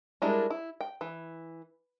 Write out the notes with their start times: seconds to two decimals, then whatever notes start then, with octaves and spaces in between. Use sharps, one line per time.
0.22 G3 G#3 D4 E4 A#4
0.50 E4
0.81 G5
1.01 E3